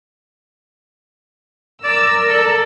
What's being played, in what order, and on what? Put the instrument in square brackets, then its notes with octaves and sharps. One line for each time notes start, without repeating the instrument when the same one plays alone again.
[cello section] A#4 [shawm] D5 [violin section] E6
[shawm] A4 [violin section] D5 E6